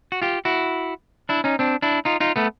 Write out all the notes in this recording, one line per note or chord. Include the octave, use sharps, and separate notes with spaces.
F#4
F4 G4
E4 F#4
D4 E4
C#4 D#4
C4 D4
D4 E4
D#4 F4
D#4 F4
A3 B3